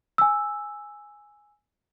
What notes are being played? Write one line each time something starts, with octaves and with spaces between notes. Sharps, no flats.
G#5 E6